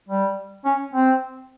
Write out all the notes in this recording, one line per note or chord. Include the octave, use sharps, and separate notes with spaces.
G3
C#4
C4